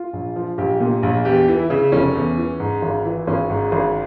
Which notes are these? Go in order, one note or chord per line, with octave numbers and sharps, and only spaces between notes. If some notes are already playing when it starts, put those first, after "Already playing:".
Already playing: F4
A#1
F3
A#1 G4
A#2
A#1
E2 G4
E3
E4
C#3
F1 C#4
E2
E3
G#2
G#1
E3
G#1 C#4
G#2
G#1